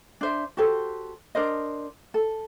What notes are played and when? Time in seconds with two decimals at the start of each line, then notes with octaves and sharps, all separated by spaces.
0.21 D4 C5 E5
0.57 F#4 G4 A4 C5
1.35 D4 A#4 C5 D#5
2.14 A4